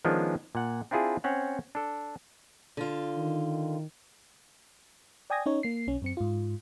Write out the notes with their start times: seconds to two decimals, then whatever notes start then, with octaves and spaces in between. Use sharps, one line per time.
0.05 D#3 F3 G#3 B3 C#4 D4
0.55 A#2 F#5
0.91 C4 D4 E4 F4 G#4
1.24 C4 C#4 C#5 F#5
1.75 D4 A4
2.77 D3 F4
3.17 D#3
5.30 D5 G5 G#5 D#6 G#6 A#6
5.46 C#4 D#4 C#5
5.63 A#3 C7
5.87 B1 C#4
6.02 F#2 C4 C#7
6.17 G#2 F4